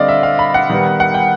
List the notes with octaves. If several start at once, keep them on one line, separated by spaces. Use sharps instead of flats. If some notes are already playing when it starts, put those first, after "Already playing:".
Already playing: D3 G3 C4 D5 D#5 F5
E5
F5
B5
F#5
D#3 G3 B3
F#5
G5